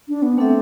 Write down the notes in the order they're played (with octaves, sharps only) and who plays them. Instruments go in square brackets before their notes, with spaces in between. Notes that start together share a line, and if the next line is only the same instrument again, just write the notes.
[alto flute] D4
B3
[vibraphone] A3 D4 A4 E5 [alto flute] C4